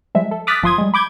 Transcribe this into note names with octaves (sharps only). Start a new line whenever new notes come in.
F3 G3 G#3 E5
A4
D6 D#6 F6 F#6 A6 B6
G1 F3 F4 C6 D#6 G#6
G3 G#3
B5 D6 G6 G#6